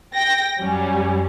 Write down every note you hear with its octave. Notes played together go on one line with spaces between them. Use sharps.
G5 A#6
F#2 F#3 G3 C#4